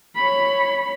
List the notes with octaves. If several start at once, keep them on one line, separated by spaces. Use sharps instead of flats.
C#5 B5